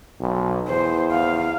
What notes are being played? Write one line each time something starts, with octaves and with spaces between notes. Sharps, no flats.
B1
E2 C5
F5